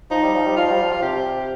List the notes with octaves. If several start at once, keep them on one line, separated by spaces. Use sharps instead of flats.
F3 D#4
G3
F3
G3
F3 F4
G3
F3
F4
C3 G4